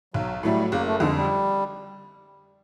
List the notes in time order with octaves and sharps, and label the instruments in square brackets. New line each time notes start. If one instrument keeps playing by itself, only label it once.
[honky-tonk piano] B1 [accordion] F#3
[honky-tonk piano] A2 F#3 A3 [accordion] G3
[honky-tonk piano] F#1 [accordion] A#3
[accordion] A3
[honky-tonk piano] F2 D3 [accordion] G#3
[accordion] G3